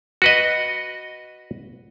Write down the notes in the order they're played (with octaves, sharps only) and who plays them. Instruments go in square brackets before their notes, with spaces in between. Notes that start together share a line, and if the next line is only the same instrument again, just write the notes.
[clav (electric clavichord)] F#4 B4 D#5